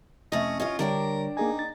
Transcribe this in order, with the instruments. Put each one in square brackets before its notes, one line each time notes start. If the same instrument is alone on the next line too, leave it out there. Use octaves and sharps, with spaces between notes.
[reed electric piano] F2 C3 [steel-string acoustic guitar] A3 C#4 [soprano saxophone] D#5
[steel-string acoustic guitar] C#4 F4 [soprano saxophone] D#5
[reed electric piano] D3 G3 C#5 [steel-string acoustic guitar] D4 D5 G5 [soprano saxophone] A#4
[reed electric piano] A#3 G#4 G#5 [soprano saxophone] D#4
[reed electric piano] A6